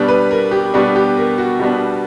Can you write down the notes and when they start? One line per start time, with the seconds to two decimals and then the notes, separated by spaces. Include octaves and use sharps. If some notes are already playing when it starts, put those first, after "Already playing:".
Already playing: B2 G3 B3 D4
0.08 B4
0.31 A#4
0.51 G4
0.74 B2 G3 B3 D4
0.96 G4
1.17 A#4
1.38 F#4
1.59 B2 G3 B3 D4